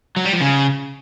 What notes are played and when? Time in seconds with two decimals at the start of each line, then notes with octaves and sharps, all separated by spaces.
0.16 F#3
0.25 G3
0.33 F3
0.41 C#3